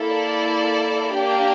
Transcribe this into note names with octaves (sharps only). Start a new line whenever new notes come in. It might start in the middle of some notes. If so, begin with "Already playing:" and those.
Already playing: A#3 E4 A4
D5
A#3 D4 G4